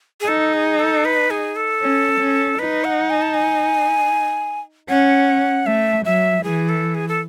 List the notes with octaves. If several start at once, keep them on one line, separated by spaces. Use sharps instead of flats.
G#4
D#4 A4
G#4
A4
B4
G#4
A4
C#4
C#4
D#4 B4
F#5
G#5
A5
G#5
C#4 F#5
A3 E5
F#3 E5
E3 G#4
A4
G#4
A4